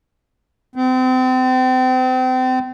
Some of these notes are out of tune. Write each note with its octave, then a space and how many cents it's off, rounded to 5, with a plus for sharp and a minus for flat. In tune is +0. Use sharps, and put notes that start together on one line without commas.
C4 -35